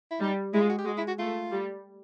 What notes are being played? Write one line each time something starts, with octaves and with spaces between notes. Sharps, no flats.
E4
G3 D#4
G#3 E4
F4
F#4
G4
G#3 F#4
E4
F#4
A3 F4
G3